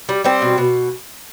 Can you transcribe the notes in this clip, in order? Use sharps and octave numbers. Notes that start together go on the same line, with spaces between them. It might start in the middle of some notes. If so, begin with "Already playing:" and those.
G3
G3 C4
B2
B2